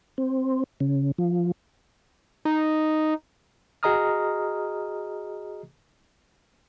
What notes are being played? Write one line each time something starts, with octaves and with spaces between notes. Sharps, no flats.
C4
C#3
F3
D#4
F#4 G#4 D#5 A#5 D#6 F6